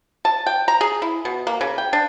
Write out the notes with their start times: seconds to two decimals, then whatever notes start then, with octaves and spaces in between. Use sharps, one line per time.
0.25 A5
0.47 G5
0.68 A#5
0.81 G#4
1.02 E4
1.25 B2
1.47 A#3
1.61 C#3
1.78 G5
1.93 D4